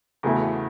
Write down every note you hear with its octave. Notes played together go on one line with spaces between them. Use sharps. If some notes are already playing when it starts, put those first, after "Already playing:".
E2 C#3 F#3 A3 E4